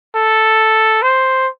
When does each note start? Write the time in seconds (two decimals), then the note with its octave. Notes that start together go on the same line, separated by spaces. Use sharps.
0.15 A4
1.03 C5